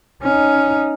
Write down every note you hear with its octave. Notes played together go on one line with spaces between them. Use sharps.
C#4 D#4